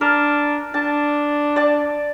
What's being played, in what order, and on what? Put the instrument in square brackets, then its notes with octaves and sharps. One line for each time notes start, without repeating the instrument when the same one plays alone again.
[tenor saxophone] D4 [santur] A#4
[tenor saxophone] D4 [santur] A5
[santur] D5 A5